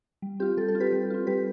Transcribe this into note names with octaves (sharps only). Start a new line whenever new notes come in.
G3
C4 F4 G4
G3 A4
A4
C4 F4
G4 B4
G3
C4 F4
G3 G4 B4